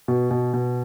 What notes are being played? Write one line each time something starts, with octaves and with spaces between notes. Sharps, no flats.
B2
B2
B2